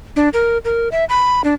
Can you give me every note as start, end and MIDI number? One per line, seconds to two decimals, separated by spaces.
0.16 0.29 62
0.33 0.58 70
0.65 0.89 70
0.92 1.05 76
1.09 1.42 83
1.44 1.54 62